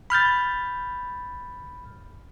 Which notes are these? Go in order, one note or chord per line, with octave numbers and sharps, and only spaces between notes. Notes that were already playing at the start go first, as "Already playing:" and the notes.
B5 F6 G6 A6